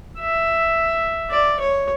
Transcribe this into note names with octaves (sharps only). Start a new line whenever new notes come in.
E5
D5
C#5